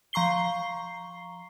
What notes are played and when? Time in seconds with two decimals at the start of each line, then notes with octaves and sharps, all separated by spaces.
0.13 F3 A#5 C#6 C7 G7